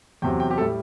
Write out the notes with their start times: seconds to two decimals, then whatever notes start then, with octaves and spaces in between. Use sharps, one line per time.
0.22 E2 C3 F#3 G5
0.40 G5
0.51 G4
0.58 A2 G3 A4